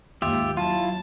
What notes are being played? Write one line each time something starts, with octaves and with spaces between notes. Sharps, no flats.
D#2 G#2 F4 G4 E5
F#3 E4 F4 A5